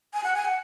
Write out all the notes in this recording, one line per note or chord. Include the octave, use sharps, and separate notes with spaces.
G#5
F#5
G#5
F#5